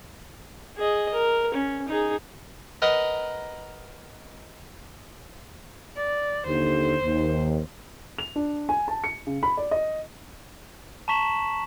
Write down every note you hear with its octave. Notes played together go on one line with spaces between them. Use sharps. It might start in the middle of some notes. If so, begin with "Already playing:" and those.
G#4 D#5
A#4
C#4
D#4 G#4
A#4 B4 D#5 F#5 A#5
D5
D#2 D3 C5
D#2
F7
D4
G#5
A5
C#7
C#3
B5
D5
D#5
A5 A#5 C#6 B6 E7 F#7